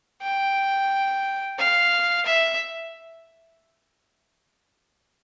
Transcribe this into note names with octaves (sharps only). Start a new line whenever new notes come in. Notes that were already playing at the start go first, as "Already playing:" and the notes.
G5
F5
E5